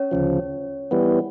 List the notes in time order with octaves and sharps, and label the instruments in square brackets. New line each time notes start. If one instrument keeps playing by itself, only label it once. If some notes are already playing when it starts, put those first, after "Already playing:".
Already playing: [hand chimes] C#4 C#5
[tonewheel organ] D2 C#3 F3
E3 G3 B3